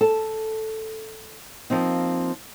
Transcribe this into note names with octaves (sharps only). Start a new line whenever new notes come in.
A4 A5
F3 A#3 C4 D#4